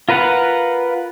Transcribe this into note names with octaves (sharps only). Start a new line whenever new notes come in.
F4 A#4 B4 F5 F#5